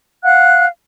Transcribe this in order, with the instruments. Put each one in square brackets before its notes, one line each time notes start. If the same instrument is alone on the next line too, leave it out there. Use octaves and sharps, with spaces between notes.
[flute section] F5 F#5 F#6